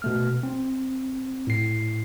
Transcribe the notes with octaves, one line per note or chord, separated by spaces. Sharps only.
B2 A3 F6
C4
A2 C7